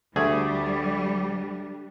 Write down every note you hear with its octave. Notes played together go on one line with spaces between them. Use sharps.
D2 G3 A3 D4 G#4 A4